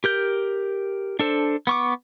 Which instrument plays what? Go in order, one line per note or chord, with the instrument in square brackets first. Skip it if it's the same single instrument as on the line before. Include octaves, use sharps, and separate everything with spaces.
[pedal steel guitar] G4 A#4 G6
D4 A4 C5
B3 C#6 D6